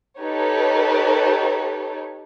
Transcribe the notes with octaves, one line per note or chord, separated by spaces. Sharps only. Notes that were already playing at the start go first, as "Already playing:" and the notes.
D#4 G4 A4 B4 C#5